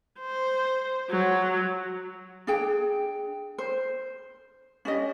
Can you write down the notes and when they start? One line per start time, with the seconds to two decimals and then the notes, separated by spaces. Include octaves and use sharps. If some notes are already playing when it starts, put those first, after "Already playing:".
0.20 C5
1.11 F#3
2.47 D4 G#4 G5
3.58 C5
4.85 C#4 D4 G4 D#5